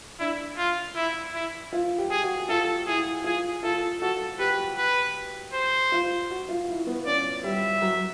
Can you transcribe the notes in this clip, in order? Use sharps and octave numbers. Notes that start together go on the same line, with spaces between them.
D4 E4
F4
E4
E4
F4
G4
G#4
F#4
F4 A4
E4 G#4
F4 G#4
F4 A4
F#4 A4
G4 B4
B4
C5
F4
F#4
F4
E4
B3
C#4 D5
G3 E5
F#3